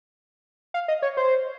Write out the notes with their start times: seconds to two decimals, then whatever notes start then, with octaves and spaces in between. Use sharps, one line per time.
0.74 F5
0.88 D#5
1.02 C#5
1.17 C5